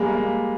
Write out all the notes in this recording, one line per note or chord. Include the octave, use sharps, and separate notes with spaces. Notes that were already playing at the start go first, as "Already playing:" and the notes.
Already playing: G3 G#3 A#3
A#3